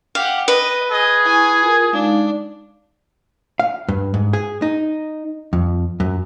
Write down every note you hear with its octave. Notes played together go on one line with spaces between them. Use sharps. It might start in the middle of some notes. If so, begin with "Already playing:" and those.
G4 F5 F#5
B4 D#5
G#4 D#5
E4 G#5 C#6
F4 A#4
G#3 D4 D#4 F5
F5
G2
G#2
G#4
D#4
F2
F#2